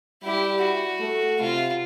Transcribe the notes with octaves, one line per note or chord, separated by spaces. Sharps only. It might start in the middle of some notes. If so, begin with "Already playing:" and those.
G3 E4 G4
F#4
A3
C3 F4